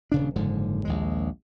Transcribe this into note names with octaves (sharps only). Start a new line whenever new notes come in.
D#1 C#3 D4
F#1 G#2 D3 F3
A#1 D#2 G#3